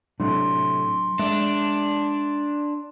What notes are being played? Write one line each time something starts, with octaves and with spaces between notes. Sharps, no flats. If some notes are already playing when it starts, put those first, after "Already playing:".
A2 C3 F#3 D4 C6
G#3 D4 E5